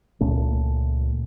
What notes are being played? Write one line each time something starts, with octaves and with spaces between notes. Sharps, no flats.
C#2 A#2 A3 C#4